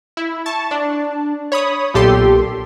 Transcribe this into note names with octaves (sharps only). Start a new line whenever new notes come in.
E4
A5 C#6
D4
C#5 B5 D#6
B1 A#2 G4 A4 C6